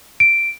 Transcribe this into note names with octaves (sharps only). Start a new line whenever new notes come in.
D7